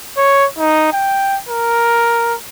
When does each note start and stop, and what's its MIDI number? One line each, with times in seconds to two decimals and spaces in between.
0.17 0.46 73
0.59 0.91 63
0.93 1.38 79
1.49 2.35 70